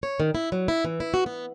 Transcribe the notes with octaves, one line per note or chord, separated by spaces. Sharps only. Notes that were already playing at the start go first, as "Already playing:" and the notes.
C#5
D#3
E4
F#3
E4
E3
E4
F#4
B3